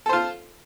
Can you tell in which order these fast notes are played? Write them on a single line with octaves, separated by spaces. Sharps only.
A4 C5 F4